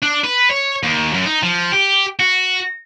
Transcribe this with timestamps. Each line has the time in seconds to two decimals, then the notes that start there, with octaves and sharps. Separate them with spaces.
0.02 D4
0.24 B4
0.50 C#5
0.83 D#2
1.14 F#2
1.26 D#4
1.43 F3
1.72 G4
2.20 F#4